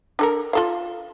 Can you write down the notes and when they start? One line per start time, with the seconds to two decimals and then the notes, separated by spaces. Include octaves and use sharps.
0.19 D4 A4 A#4
0.53 F4 A4 F5